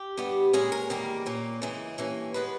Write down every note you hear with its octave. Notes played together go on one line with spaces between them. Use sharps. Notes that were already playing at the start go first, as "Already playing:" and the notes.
Already playing: G4
G2 G3 B3
A#2 G#3 C#4 G#4
A#4
E2 D#3 G3 A#3
A#2 A#3 C#4
C#3 E3 G#3
G2 E3 A#3 C#4
D#3 G#3 B3 B4